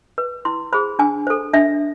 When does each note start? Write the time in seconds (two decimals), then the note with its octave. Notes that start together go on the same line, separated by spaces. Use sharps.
0.18 B4
0.45 E4 C6
0.73 G#4 C5 B5
0.99 D4 G#5
1.27 A4 C5
1.54 D4 E5